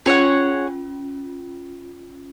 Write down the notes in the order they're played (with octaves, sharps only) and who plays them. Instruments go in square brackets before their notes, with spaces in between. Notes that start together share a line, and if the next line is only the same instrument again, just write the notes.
[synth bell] C#4 F4 [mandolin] G#4 C#5 F#5